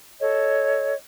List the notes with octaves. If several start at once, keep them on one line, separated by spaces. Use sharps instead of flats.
A4 C#5 D#5